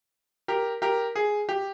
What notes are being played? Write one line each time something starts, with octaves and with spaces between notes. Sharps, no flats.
G4 A#4
G4 A#4
G#4
G4